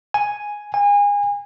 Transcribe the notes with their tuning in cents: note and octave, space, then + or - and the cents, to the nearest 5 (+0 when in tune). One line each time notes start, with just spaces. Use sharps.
G#5 +0
G#5 -30